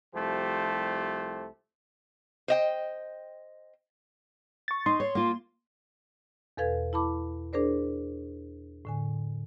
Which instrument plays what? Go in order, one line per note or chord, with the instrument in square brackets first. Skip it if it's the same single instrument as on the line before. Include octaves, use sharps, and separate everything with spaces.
[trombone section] C2 F3 A3 G4 C5
[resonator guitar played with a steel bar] C5 D#5 G5
[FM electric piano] C#6 A6
[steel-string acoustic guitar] D#4 [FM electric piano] C6
[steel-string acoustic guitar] C#5
A#3 F4
[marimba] E2 B2 A4 B4 F5 G#6
E4 A5 B5 D6
D4 G#4 A#4 C5 D5
A2 D3 G#5